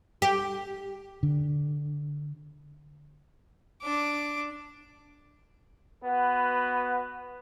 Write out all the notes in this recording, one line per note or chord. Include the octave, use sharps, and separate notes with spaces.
G4
D3
D4 D6
B3 F#4 B4